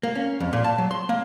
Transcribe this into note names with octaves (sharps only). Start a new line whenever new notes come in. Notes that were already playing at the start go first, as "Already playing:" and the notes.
A#3
C#4
F2
A#2
A5
F#3
C6
A#3